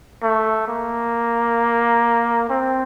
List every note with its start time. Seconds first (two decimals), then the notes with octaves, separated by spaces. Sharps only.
0.23 A3
0.68 A#3
2.49 C4